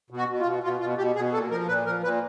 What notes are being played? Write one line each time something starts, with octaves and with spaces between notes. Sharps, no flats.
B2
F#4
B2
F4
B2
B2 F4
B2 F4
B2 G4
B2 G#4
A#2 A4
F3 A#4
A#2 B4
F3 A#4
A#2 B4